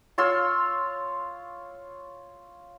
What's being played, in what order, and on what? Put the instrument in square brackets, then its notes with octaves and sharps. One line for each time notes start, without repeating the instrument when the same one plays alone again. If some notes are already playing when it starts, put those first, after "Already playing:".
[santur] F4 C#5 C6 E6